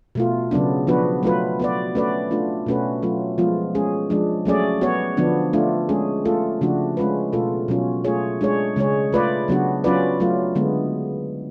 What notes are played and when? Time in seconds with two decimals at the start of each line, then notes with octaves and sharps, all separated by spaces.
0.15 B2 A3 F4
0.51 C#3 F#3 B3 D4
0.87 F3 B3 D4 F#4 B4
1.23 F#3 A3 F4 B4
1.60 B3 F#4 B4 D5
1.95 A3 C#4 F#4 B4 D5
2.31 A3 D4 F4
2.66 B2 A3 C#4 F#4 B4
3.02 F#3 A3 F4
3.38 F3 G#3 B3 F4
3.75 G#3 C#4 G#4
4.10 F3 G#3 D4
4.45 F#3 A3 C#4 G#4 D5
4.81 B3 F#4 C#5
5.17 D3 F3 B3 D4
5.53 A3 D4 F4
5.89 G#3 C#4 G#4
6.25 A3 F4 A4
6.61 C#3 F3 A3 D4 F#4
6.97 G#3 C#4 F4 B4
7.33 B2 A3 F4 A4
7.68 B2 F#3 C#4 F4
8.04 A3 F4 G#4 C#5
8.41 G#3 D4 G#4 C#5
8.76 C#3 G#3 C#4 G#4 C#5
9.13 A3 F4 B4 D5
9.48 C#3 F#3 B3 D4 F#4
9.84 F#3 C#4 F4 B4 D5
10.20 F#3 A3 F4
10.55 D3 G#3 B3